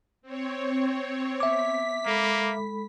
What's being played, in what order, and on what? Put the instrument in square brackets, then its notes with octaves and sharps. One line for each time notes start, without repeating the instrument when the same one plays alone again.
[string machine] C4 C#5
[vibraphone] B3 [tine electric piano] E5 D6 [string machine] B6
[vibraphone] G#3 A4 B5 [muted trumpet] A#3